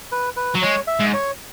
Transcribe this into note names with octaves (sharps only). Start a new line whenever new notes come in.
B4
B4
F#3
G#3 C#5
E5
G#2
C#5